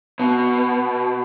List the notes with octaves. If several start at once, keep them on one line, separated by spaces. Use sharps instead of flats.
B2